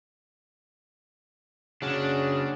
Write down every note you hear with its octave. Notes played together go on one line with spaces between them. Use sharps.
C#3 C#4 D4 F#4 G#4